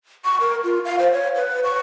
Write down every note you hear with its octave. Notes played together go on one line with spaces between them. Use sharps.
C#6
A#4
F4
F5
C5
C#5
B4
C#6